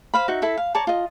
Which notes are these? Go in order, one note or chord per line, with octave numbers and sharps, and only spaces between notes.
C5 F5 B5
D#4 F#4 E5
E4 A4 E5
F5
C#5 D5 A5 A#5
F4 D#5